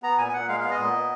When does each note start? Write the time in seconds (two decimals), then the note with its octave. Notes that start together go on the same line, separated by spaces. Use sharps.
0.03 B3 A#5
0.18 A#2 G#5
0.28 G#5
0.33 A#2 F#5
0.48 G#3 F5
0.60 B3 F5
0.71 D#5
0.79 A#2
0.93 B3